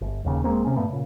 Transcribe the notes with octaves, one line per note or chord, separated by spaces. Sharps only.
G1
D#1 D#2 C#3
D#1 G#3 A#3 C4
C3 C#4
G2 A#2 A3 B3
A#2 C#3